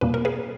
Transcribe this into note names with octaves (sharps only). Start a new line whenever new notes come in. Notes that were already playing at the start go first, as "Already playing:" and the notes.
E2 B2 G3 A#3 B4
A#4
G#4 B4